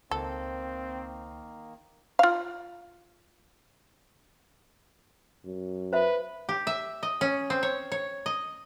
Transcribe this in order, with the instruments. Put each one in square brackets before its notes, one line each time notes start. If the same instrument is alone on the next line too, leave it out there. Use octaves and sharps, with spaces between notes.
[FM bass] C#2 [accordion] D#3 A#3 [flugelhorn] C4 [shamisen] A4
[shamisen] F4 F5
[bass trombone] F#2
[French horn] B4 [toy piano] C5 E5
[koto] G4
E5
D#5
C#4
C4
C#5
C#5
D#5